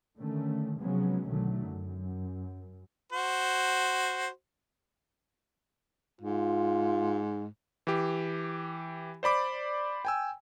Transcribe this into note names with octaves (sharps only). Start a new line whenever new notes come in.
D3 D#3 A3 C#4
C3 F3 F#3 G#3 B3 C#4
B1 D3 D#3 F#3 A3
F#2
F#4 C5
G#2 F4
E3 G4
C5 D5 B5 D6
G5 G#5 E6